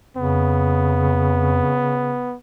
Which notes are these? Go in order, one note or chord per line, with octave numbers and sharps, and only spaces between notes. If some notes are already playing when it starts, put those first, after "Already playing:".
F2 C#3 B3